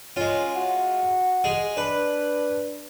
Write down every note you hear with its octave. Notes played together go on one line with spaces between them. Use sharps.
G#3 C#4 F4
F#4
G#3 G#4
D4 B4